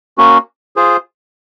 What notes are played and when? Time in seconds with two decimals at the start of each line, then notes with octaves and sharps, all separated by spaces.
0.18 A#3 C#4 F#4
0.76 F4 G#4 C5